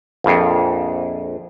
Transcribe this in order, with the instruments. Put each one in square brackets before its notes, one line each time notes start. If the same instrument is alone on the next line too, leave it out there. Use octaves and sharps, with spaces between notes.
[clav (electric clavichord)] A#1 F2